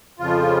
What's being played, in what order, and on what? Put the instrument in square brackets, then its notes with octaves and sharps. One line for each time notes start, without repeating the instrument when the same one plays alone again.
[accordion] F2 C#3 F3 F4